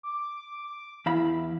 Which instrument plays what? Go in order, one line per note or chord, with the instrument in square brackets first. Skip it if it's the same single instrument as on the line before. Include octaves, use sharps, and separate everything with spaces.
[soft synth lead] D6
[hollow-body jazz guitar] E2 F5 B5 [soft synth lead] E4